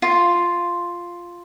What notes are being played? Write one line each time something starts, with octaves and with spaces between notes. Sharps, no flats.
F4